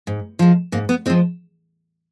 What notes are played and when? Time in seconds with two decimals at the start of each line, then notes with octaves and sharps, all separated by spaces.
0.07 G#2
0.39 F3 G#3
0.72 G#2 A#3
0.89 B3
1.06 G#3 C4
1.10 F3